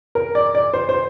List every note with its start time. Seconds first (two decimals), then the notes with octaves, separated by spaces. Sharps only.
0.15 A#4
0.35 D5
0.55 D5
0.74 C5
0.89 C5